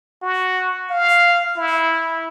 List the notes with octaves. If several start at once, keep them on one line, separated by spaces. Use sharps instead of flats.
F#4
F5
E4